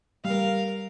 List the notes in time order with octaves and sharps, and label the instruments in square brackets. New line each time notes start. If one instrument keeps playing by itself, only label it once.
[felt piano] G3 [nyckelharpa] A#4 F5